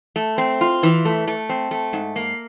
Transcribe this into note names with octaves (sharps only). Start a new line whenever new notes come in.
A3
C4
F4
E3
A3
A3
C4
A3
G#2
A#3